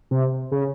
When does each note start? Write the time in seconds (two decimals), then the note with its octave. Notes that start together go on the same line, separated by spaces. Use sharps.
0.11 C3
0.52 C#3